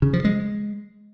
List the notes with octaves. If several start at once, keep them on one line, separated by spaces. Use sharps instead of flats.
C#3
F3
G#3